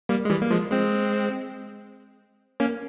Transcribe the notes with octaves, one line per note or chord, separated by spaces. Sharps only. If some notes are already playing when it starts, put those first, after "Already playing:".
G3 A#3
G#3
E3 G3
A#3
F3 G#3
G#3 C4
A#3 C#4